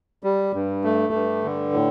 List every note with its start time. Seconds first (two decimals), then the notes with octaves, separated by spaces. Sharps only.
0.23 G3
0.54 G2
0.84 A3
1.13 G2
1.44 D3
1.73 A2